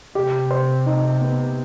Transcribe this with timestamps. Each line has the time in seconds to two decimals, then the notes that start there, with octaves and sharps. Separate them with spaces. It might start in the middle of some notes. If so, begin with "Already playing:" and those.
0.15 C3 G4
0.51 C5
0.86 D#4
1.21 B3